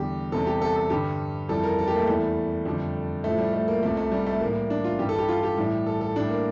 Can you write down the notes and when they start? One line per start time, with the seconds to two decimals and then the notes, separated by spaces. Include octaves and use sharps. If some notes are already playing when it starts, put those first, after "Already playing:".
Already playing: E2 D3 G3 G4
0.32 E2 C3 G3 A4
0.47 G4
0.62 A4
0.76 A4
0.90 G2 D3 G3 G4
1.49 F2 E3 G3 A4
1.64 A#4
1.79 A4
1.88 G4
1.93 A#3
1.97 A3
2.07 E2 E3 G3 A3
2.65 F2 D3 G3
3.24 A2 F3 A3
3.39 G3
3.53 A3
3.68 A#3
3.82 C2 C3 F3 A3
3.97 A3
4.12 G3
4.26 A3
4.41 A2 E3 G3 A#3
4.70 D4
4.84 F4
4.99 G2 E3 G3 G4
5.09 A4
5.19 G4
5.29 F4
5.43 G4
5.58 A2 E3 G3
5.86 A4
6.01 A4
6.16 A2 G3 D4
6.30 A#3